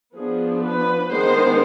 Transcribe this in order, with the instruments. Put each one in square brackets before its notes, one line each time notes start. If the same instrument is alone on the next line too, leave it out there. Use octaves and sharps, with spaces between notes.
[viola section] F3 B3 D4 G#4
B4
D#3 G#3 B3 D4 C5